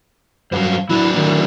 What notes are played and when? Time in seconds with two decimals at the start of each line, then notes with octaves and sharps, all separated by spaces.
0.52 G2 F#3 C5 F5
0.89 F#3 D4 E4
1.15 A2 D3 D#3